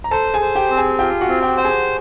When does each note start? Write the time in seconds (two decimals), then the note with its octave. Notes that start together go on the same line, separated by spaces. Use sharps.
0.04 A#5
0.11 A4 C5 A5
0.34 G#4 G#5
0.41 C5
0.55 G4 G5
0.70 C4
0.77 G#4 G#5
0.99 F4 G4 G5
1.21 F#4 F#5
1.28 C4
1.42 G4 G5
1.57 C5 G5
1.64 G#4 G#5